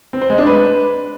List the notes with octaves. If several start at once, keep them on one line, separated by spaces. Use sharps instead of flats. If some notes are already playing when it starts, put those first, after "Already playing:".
C4
C5
G#3
D4
B4